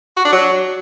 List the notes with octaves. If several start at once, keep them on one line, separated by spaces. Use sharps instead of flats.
F#4
D4
F#3